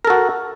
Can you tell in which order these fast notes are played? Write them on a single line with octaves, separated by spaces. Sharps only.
A#4 A4 F#4